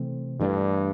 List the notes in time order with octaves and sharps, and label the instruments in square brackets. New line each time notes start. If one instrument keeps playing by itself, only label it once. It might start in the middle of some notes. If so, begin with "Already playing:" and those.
Already playing: [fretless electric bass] C3 E3 A3 C4
[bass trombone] G2 [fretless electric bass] E3 A3 D4